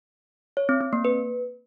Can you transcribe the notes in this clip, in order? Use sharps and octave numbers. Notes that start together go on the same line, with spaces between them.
C#5
C4
C4
A#3
B4